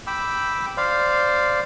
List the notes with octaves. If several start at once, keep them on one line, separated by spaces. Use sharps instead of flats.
G5 B5 D6 E6
C5 D5 F5